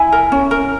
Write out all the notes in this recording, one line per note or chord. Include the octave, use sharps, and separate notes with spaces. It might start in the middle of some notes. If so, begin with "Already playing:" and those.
Already playing: E4 G#5
A#4
C#4
A#4